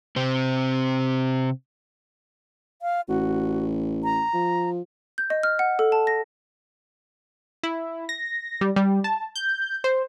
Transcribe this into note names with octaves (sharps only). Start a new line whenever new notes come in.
C3 C4
F5
A1 F#4
A#5
F3
G6
D#5
F6
F#5
A4
A5
A#6
E4
A#6
G3
G3
A5
G6
C5